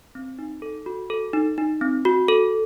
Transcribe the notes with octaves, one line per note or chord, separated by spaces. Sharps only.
C4
D#4
A4
F#4
A4
D#4
D#4
C4
F#4
A4